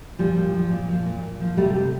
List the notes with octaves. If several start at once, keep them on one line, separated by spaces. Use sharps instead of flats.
A#2 F3 G3
A#2
F3
A#2
F3
A#2
A#2
F3
C3 G3 A3
C3